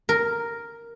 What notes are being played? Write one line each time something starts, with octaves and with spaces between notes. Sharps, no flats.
A#4